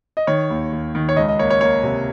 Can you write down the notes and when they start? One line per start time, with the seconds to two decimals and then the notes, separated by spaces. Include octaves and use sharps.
0.17 D#5
0.27 D#3 C#5
0.50 D#2
0.72 D#2
0.95 D#3
1.09 C#5
1.16 C#2 D#5
1.28 D#5
1.39 A#3 C#5
1.50 C#5
1.61 A#3 C#5
1.83 C3